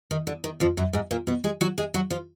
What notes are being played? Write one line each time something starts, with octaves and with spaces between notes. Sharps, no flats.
D#3
D3
D#3
F2 F3
F#2 F#3
G#2 G#3
A#2 A#3
B2 B3
G#3 G#4
F#3 F#4
G#3 G#4
F#3 F#4
F3 F4